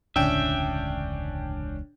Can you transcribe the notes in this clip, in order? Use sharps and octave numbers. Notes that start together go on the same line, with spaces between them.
E1 C#2 A2 D3 C#4 D4 E5 G5